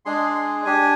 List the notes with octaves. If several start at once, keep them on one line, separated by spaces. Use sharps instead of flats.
G#3 D4 G#4 C6
C6
D4 G4 G#5